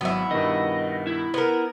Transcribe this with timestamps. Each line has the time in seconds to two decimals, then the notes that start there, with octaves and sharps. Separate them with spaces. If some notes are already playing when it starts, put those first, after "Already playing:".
0.01 G#1 F#3 B3 E4
0.31 G2 B2 D#3 D#5
1.07 E4
1.34 B3 A#4